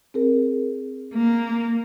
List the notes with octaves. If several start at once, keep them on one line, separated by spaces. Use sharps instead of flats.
C4 G#4 A#4
A#3